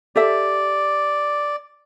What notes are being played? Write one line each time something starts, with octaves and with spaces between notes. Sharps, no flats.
G4 A4 D5 E5